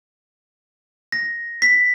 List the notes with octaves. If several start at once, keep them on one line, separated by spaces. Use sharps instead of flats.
A#6
B6